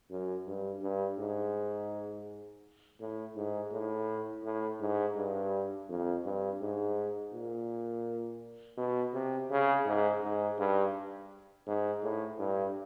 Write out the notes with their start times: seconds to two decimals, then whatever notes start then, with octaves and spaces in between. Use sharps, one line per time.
0.10 F#2
0.47 G2
0.82 G2
1.19 G#2
3.00 A2
3.36 G#2
3.72 A2
4.44 A2
4.81 G#2
5.17 G2
5.89 F2
6.25 G2
6.61 G#2
7.33 A#2
8.77 B2
9.14 C3
9.51 C#3
9.86 G#2
10.23 G#2
10.59 G2
11.67 G#2
12.03 A2
12.39 G2